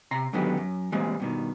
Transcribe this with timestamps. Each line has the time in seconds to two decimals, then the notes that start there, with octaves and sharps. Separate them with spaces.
0.11 C3 A#5 C6
0.33 G#2 D3 D#3 F#3 B3 G4
0.57 F#2
0.92 E3 G3 G#3 A#3 C4
1.20 G2 B2 D#3